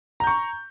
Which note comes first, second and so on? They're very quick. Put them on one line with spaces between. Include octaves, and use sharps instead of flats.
A#5 G6 C#6